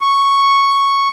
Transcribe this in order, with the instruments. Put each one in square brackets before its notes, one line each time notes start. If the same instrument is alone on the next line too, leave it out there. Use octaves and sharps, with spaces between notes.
[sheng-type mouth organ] C#6